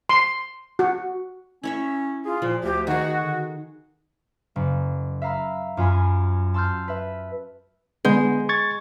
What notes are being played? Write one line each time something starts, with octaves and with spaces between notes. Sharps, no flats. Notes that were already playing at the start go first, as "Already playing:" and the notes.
C6
F#4
C#4 E4 C#5 E5
F4 G#4
A#2 F3
D2 G4
D#3 F#4 G#4
D3
F#1
E5 F5 A#5 B5 E6
F#2 F4 G#5 B5
A5 C6 E6 F6 G6
B4 E5
D3 G#3 B3 G6
C#6 G#6 A6